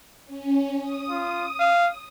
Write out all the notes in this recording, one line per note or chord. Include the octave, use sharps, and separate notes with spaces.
C#4
D#6
F4
F5